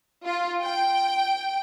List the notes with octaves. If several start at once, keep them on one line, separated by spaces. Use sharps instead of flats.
F4
G5